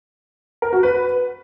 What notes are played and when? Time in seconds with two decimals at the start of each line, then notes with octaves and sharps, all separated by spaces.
0.62 A#4
0.73 F#4
0.83 B4